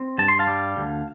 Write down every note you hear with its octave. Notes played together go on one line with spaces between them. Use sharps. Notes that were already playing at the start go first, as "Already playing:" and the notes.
Already playing: C4
G2 A5
C6
F5 A5
G3
D2